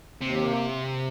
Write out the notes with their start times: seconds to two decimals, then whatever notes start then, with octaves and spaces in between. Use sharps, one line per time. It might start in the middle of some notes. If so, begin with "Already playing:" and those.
0.21 D#2 C3
0.37 A#3